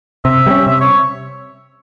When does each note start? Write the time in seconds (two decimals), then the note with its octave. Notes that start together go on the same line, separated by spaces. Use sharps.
0.25 C3 E5
0.47 G3 A#3 C#4
0.67 C3 E5
0.81 C#5